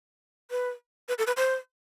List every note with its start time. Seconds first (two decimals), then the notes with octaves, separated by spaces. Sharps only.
0.51 B4
1.09 B4
1.18 A4
1.27 B4
1.37 C5